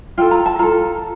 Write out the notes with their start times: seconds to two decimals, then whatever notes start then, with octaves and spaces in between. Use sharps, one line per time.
0.18 F4 A4 G5
0.31 A#5
0.46 A5
0.59 F4 A4 A#5